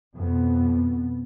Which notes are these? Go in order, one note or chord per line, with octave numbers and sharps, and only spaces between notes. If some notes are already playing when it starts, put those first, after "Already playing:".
F2 B2 B3